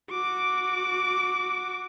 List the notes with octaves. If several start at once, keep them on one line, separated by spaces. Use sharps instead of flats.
F#4 D6